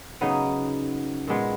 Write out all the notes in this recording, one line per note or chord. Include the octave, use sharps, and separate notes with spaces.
C#3 F#3 B3 D#4
A#2 G#3 B3